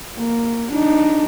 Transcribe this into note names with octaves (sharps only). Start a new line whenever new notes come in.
A#3
D4 D#4